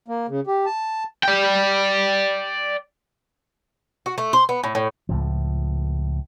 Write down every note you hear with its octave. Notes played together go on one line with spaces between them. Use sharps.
A#3
C#3
G4
A5
D5 G5
F#4
A3
C5
B3
A2
A2
C#2 A2 F3